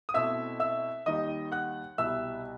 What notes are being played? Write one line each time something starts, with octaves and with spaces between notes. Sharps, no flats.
D#6
B2 A3 C4 E4 E5 E6
E5 E6
D#2 D#3 G3 D#4 D#5 D#6
F#5 F#6
C2 B2 G3 E5 E6